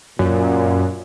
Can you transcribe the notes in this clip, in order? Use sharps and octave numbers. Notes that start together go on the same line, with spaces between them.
F#2 A#2